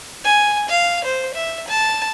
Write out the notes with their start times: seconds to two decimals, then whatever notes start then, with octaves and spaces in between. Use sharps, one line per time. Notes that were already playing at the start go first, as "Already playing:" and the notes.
0.25 G#5
0.69 F5
1.05 C5
1.34 E5
1.68 A5